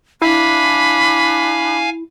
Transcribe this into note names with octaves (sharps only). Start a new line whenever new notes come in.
D4 E4 F5 G#5 B5